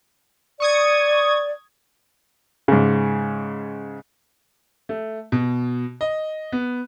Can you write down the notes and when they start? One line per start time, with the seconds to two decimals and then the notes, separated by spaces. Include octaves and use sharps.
0.60 D5 C#6 D#6 G#6
2.68 G#2 C#3
4.89 A3
5.32 B2
6.01 D#5
6.52 B3